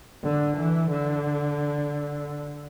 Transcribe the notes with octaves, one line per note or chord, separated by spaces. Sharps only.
D3
E3
D3